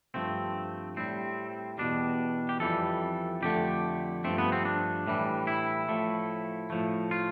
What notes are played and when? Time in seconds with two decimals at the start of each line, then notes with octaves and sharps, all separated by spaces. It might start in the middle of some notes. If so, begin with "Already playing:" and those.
0.14 G2 F3 A3 C4
0.96 A2 G3 C4
1.78 E2 B2 G3 D4
2.49 G4
2.60 F2 E3 G3 A4
3.42 F2 D3 A3 G4
4.24 G2 F3 A3 C4
4.38 B3
4.52 C4
4.65 D4
5.07 A2 E3 G3
5.47 E4
5.88 A2 F3 A3
6.70 A2 F3 A3
7.11 F4